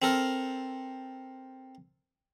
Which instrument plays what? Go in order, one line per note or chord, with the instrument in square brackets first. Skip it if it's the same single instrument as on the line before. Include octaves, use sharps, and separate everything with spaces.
[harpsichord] C4 A4 A#4